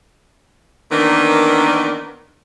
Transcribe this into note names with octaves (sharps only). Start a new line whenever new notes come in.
D#3 E3 A#3 B3 D4